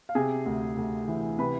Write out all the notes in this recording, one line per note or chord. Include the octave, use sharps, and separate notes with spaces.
F5
C3 G#4 G#5
D2
D2
E3
C3 B4 B5